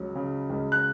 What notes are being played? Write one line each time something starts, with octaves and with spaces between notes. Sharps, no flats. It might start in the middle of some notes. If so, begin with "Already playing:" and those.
Already playing: C#2 F#3
C#3
C#2
F#6